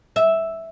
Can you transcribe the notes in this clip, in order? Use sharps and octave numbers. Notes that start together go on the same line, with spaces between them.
E5